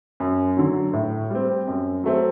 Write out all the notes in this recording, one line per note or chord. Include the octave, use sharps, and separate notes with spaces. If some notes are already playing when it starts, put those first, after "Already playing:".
F#2
D3 F#3
A2
G3 C4
F#2
F#3 A3 C4